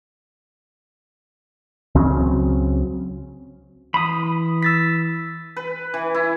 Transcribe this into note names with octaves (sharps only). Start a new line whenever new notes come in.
C#2 C#3 F#3 C4
E3 B5 D#6
E6 A6 B6
B4
E3
E4